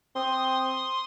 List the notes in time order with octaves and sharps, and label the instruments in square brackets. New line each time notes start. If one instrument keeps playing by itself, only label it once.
[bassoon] C4 [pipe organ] C6 D#6